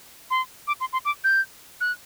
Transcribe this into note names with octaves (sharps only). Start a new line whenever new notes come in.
C6
D6
C6
C6
D6
G6
F#6